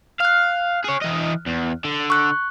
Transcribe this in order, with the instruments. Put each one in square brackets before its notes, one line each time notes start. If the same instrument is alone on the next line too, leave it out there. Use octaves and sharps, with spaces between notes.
[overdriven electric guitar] F5 [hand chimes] F6 F#6
[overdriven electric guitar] G#4 C#5
E3 D#5
E2
D3
[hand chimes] C#6 F#6